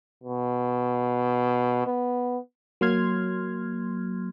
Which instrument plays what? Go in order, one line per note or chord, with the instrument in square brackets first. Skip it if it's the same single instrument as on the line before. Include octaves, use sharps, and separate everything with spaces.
[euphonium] B2
B3
[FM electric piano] F#3 A#3 C6 F6 G#6